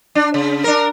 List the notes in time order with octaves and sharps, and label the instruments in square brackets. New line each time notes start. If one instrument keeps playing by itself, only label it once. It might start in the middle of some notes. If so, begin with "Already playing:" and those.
[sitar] D4
C#3
D4 A#4